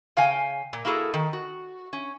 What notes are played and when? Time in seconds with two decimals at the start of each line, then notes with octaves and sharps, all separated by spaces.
0.17 C#3 F5 G5 G#5
0.73 A#2
0.85 A#3 E4 F#4 G#4 A4
1.14 D#3
1.33 F#4
1.93 C#4